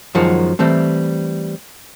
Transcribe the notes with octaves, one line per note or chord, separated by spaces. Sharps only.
F#2 D#3 F3 G#3 F#4
E3 G3 A3 C4